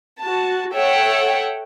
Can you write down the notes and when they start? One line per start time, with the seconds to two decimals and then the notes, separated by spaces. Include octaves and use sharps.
0.21 F#4 A5
0.76 A4 C#5 E5 F#5 G5